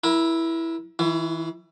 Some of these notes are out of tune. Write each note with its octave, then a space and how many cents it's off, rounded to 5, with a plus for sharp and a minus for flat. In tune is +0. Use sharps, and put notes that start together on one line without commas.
E4 +0 A#4 +40
E3 -30 E4 +35